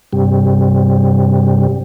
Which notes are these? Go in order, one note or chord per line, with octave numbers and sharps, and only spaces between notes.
G2 C3 G3